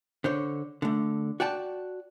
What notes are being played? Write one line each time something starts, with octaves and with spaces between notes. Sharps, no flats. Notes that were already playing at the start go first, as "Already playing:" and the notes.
D3 C5 C#5
D3 A3
F#4 D5 G5 A5